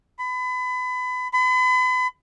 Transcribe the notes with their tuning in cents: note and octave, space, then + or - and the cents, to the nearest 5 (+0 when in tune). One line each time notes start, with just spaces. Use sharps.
B5 +30
B5 +40